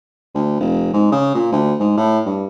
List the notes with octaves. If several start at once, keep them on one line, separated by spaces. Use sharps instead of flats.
D2
F1
G#2
C#3
A#2
D2
G#2
A2
G2